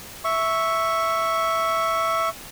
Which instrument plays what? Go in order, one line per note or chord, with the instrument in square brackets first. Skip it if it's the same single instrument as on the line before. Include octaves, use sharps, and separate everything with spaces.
[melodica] E5 C#6